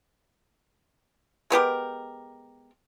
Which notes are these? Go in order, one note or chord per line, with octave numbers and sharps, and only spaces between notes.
G#3 B3 G4 A#4